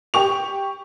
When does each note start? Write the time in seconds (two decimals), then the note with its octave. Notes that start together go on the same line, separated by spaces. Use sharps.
0.14 G4 C#6 F7